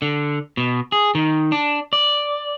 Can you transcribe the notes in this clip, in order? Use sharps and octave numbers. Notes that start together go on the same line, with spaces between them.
D3
B2
G#4
D#3
D4
D5